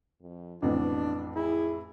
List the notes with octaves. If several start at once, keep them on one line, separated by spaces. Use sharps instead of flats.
F2
A1 F2 B2 D4
E4 G#4